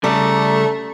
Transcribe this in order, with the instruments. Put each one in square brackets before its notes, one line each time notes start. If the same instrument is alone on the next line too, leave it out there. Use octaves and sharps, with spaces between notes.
[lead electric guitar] C#3 G3 [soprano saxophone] A3 [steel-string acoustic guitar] A4 D5 [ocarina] A#5